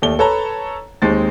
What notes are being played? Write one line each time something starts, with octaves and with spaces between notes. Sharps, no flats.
D#2 A3 D5 G7
A4 B4 C#5 A5 A#5
D#2 G#3 C4 D#4 A6